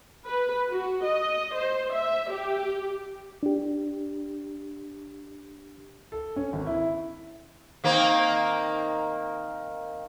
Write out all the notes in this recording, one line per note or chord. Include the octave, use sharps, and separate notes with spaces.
B4
F#4
D#5
C5
E5
G4
D4 G4
A4
C#4
G#1
E4
D#3 A#3 C4